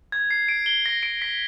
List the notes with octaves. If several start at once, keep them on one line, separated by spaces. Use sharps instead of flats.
G#6
C7
D7
G7
A#6
D7
B6